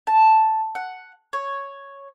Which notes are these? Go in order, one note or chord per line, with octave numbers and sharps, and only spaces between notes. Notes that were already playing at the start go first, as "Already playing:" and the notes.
A5
F#5
C#5